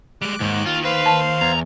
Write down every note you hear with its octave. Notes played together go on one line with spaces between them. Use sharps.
G3 G#3 D6 F#6
D#2 G#2 D#3
F4
B4 C5 F5
A5
E2 A#5